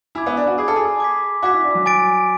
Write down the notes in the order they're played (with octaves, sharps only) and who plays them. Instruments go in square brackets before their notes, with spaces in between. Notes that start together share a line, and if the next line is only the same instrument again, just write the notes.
[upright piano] E4 [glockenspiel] G#5 B5 D6 G#6
[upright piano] B3
D4
F#4
[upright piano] G#4 [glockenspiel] G#5 B5 D6 G#6
[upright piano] A4
G#4
[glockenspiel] D6 G#6 B6
[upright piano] F#4 [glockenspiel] D6 G#6 B6
[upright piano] E4
D4
F#3
[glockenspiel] G#5 D6 A6 D7